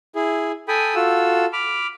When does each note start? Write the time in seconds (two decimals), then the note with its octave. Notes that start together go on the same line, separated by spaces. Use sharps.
0.15 E4 G#4
0.68 A4 G5 G#5 B5 D#6
0.95 F4 F#4 A4 E6
1.53 B5 D6 F6